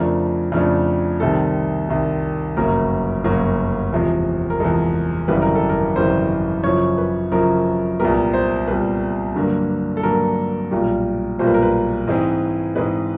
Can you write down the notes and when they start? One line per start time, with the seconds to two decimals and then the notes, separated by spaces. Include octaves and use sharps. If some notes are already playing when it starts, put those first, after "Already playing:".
Already playing: F2 C#3 F3 A3 D4 A#4
0.52 F2 C#3 F3 A3 D4
1.20 C2 C3 D#3 G3 A4
1.89 C2 C3 D#3 G3
2.57 G1 F#2 C#3 F#3 A#3 A#4
3.24 G1 F#2 C#3 F#3 A#3
3.92 E2 C3 F3 G#3
4.50 A#4
4.60 E2 C3 F3 G#3 A4
5.28 G#1 F#2 C#3 E3 G3 B4
5.42 A#4
5.55 A4
5.69 A#4
5.96 G#1 F#2 C#3 E3 G3 C5
6.64 F#2 C#3 F3 C#5
6.98 B4
7.31 F#2 C#3 F3 A#4
8.00 C2 A#2 G3 B3 A#4
8.34 C5
8.68 C2 A#2 G3 B3 B4
9.35 G2 D3 F#3 A#3
9.97 A4
10.03 G2 D3 F#3 A#3 A#4
10.71 B1 A#2 G3
11.39 B1 A#2 G3 C5
11.47 B4
11.54 A#4
11.62 B4
12.07 G#2 E3 G#3 C4
12.75 G#2 E3 G#3 C4 B4